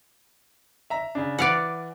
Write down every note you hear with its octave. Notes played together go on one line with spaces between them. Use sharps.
E5 A#5
C#3 D4
E3 D5 F5 F#5